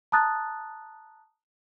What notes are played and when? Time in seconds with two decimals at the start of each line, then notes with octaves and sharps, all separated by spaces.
0.12 A5 A#5 D#6 F#6 A6